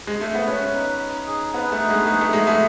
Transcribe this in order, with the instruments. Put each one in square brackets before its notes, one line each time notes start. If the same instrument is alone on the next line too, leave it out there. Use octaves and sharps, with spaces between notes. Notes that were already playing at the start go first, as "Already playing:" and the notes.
[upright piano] G#3
A3
B3
[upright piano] C#4 [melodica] B4
[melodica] D#4
D#4
G#4
[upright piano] B3 [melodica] B4
[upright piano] A3
[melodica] D#4
[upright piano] G#3
[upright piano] A3 [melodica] G#4
[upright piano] A3
[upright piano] G#3 [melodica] G#4
[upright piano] A3